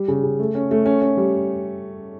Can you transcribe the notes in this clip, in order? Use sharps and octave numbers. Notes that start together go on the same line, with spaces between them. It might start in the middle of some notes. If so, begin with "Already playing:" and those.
Already playing: G3
C#3
C#3
A3
C#4
A3
C#4
C#4
G3